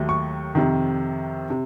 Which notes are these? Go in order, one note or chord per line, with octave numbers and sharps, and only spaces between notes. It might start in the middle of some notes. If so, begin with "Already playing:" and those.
Already playing: D#2 D#3 F#3 A3
C#6
F2 C3 D#3
C3